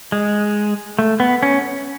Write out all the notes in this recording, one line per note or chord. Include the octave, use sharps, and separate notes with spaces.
G#3
A3
B3
C#4